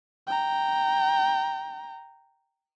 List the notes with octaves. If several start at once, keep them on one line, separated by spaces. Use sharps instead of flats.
G5 A#5